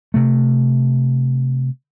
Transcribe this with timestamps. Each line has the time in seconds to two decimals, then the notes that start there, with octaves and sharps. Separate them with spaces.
0.14 C3 A3